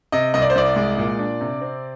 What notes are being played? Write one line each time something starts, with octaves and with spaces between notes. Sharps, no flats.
C3 D#5
C2 D#5
D5
C5
C2 D5
G#3
A#2
D4
C3
C4